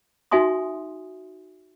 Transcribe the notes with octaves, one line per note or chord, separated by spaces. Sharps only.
D#4 F#4 E5 G#5 C6 D#6